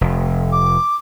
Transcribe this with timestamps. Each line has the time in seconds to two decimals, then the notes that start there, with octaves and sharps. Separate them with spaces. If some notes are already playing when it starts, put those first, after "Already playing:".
0.01 F1
0.52 D6